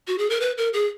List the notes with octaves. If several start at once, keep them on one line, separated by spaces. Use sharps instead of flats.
F#4
G#4
A#4
B4
A#4
G#4